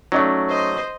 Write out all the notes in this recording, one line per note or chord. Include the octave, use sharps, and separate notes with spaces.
F#3 A3 C#4 D#4 D5
C5 D#5